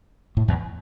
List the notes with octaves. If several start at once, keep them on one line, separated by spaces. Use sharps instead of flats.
A2
E2